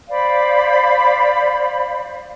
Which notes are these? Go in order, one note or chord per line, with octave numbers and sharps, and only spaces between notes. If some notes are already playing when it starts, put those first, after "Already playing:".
C5 D5 F5 B5